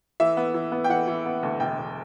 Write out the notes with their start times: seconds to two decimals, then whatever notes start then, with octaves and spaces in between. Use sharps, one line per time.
0.20 E3 E5
0.37 B3
0.54 E3
0.72 B3
0.84 G5
0.89 E3 F#5
1.07 E3
1.26 B3
1.43 D2
1.60 E1 G5
1.78 E1